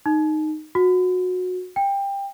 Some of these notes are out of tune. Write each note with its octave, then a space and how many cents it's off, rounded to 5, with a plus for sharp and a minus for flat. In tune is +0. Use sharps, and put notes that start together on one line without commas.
D#4 -10
F#4 -20
G5 +20